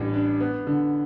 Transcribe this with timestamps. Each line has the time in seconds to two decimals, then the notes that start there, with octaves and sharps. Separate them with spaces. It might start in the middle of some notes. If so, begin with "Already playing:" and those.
Already playing: A1 G2 G3
0.14 D4
0.40 B3
0.67 D3